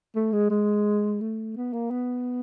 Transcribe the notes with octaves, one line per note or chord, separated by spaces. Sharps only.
A3
G#3
G#3
A3
B3
A#3
B3